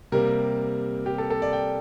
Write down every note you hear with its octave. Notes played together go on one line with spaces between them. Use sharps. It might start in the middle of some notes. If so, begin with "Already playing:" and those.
C3 G3 A#3 A#4
G4
A4
A4
D5
G5